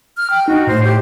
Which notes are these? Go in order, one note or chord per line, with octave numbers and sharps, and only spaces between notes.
F6
G5
D#4 F#4
A2 C5
G4